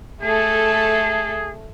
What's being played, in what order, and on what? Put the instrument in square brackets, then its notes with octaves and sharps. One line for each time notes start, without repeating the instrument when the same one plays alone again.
[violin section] A3 A4 [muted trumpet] G#4